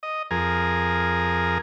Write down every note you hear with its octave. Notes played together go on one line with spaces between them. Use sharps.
D#5
F2 G#4 A#4